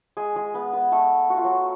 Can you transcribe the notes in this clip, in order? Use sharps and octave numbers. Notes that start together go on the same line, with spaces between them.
G#3 G#4
G#3 G#4
B3 B4
B3 B4
A3 A4
F#4
F4
F#3 F#4